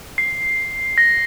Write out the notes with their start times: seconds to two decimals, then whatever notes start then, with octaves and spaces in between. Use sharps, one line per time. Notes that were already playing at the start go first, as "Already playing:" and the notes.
0.18 C7
0.98 A#6